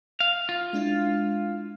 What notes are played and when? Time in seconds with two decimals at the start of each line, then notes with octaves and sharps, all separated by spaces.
0.20 F5
0.49 F4
0.73 G#3 D4 E4